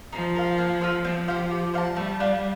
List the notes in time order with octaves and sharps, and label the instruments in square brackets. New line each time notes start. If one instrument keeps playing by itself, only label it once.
[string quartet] F3 [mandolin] D#4
[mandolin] A#4 F5
A#3
F4 A4 C5
[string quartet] F3 [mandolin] C4
[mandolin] G4 C5 F5
G4
C5 F5
A5
[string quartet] G3 [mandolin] A3
[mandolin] D4 F4